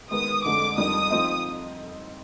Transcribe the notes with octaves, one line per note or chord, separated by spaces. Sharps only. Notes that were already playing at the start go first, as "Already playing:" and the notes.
D#3 G#3 B3 D#4 D#6
F2 D3 G#3 D6
F2 D#3 G3 D4 D#6
F3 C4 D#4